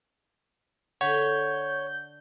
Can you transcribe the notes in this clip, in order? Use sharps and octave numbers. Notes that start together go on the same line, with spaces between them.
D3 C#5 F#5 G6